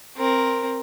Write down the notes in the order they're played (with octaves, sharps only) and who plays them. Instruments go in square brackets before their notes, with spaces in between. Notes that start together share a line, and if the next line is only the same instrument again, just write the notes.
[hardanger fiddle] C4 A#4